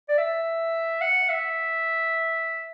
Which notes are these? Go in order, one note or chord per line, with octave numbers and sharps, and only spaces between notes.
D5
E5
F#5
E5